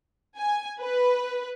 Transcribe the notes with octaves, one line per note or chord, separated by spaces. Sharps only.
G#5
B4